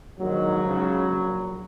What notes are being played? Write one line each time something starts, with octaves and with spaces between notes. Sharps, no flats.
A#1 G#2 D#3 F#3
C#2 C#3
A#1 A#2